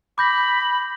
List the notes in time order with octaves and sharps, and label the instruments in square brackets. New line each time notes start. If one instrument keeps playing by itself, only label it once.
[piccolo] B5 [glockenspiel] D6 G6 A#6